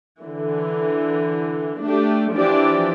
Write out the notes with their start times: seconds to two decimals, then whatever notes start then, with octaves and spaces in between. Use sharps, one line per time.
0.22 D3 E3
1.84 A3 D4 G4
2.33 E3 F3 D4 G4 D5